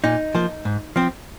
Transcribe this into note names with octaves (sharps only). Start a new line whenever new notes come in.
A#2 D#4
F3 A#3
G#2
F3 C4